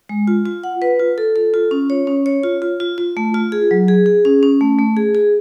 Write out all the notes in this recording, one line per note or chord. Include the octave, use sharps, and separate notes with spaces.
G#3
F4
F4
F#5
B4
F4
A4
A4
F4
C#4
C#5
C#4
C#5
F4
F4
F4
F4
A3
F4
G#4
F#3
G#4
G#4
C#4
C#4
A3
A3
G#4
G#4